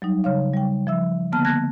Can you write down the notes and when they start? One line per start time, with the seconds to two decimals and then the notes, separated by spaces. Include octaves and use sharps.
0.02 F#3 G3 D#4
0.24 C#3 C#5 F5
0.54 G3 G5
0.87 F3 E5 E6
1.32 D3 A#3 B3 A5 F6
1.45 A5 F#6 G#6 A#6